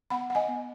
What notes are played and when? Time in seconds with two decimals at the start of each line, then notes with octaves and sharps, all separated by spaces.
0.10 B3 F#5 B5
0.30 F#5
0.35 D#5 G#5
0.48 B3